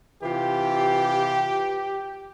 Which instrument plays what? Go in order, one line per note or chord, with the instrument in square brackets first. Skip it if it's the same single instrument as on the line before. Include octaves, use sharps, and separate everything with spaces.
[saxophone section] C3 E3 F4 [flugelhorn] G4